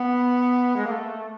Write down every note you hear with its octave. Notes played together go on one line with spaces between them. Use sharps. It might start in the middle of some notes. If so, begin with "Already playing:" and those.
Already playing: B3
G#3
A#3
A3